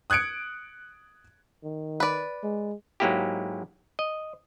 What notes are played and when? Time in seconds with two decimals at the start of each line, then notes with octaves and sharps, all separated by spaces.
0.10 D#6 F#6 G#6 C#7 D7
1.64 D#3
2.00 B4 D5
2.43 G#3
3.00 G#2 F#3 G#3 A#3 E4 G4
3.99 D#5